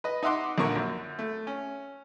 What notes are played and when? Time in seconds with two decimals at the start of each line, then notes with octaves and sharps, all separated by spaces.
0.04 B4 D#5
0.23 D#4 D#5 E5 F#5 C6 D6
0.58 A#1 A#2 D3 A#4 C#6
0.75 F#2
1.19 A3
1.47 C#4